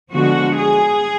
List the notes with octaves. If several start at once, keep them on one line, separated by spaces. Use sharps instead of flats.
D3 F3 G#3 B3 F#4
G#4